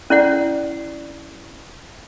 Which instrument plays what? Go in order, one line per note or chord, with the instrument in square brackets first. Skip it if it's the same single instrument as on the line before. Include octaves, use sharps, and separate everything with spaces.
[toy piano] C#4 E4 D5 F#5